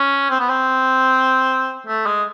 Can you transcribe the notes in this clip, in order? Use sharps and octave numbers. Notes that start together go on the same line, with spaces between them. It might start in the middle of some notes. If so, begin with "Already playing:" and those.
Already playing: C#4
C4
B3
C4
A3
G#3